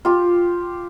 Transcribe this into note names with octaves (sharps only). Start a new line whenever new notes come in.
F4 G4